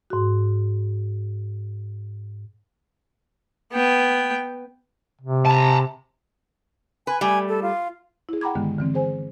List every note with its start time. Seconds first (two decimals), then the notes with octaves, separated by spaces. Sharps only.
0.10 G#2 F#4
3.73 B3 G5
5.21 C3
5.45 A5 A#5
7.07 B4 G#5
7.21 G3 A3 G#5
7.49 A4
7.63 F4
8.29 E4 G#4
8.41 F#5 G5 A#5 B5 D6 G#6
8.55 G2 D3 D#3 G#3 B3
8.79 D3 E3 C4
8.94 G#4 C5 G#5